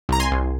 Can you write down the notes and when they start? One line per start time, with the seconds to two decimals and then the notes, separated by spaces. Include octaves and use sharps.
0.09 C2 A#5
0.20 G#5 C6
0.32 C2